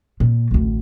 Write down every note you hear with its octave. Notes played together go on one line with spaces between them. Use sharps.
A#2
A1 D2